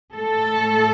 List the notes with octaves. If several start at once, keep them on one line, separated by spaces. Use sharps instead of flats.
A2 A3 A4